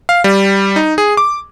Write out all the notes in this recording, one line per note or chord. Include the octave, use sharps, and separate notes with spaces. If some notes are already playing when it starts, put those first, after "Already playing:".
F5
G3
D#4
G#4
D6